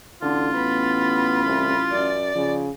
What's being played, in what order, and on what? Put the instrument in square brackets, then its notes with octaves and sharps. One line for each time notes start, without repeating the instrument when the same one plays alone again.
[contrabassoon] A1 [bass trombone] D3 [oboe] F4
[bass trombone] B3 [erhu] B5
[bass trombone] C2
[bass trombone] F#2 [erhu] D5
[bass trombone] C#3 [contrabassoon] F3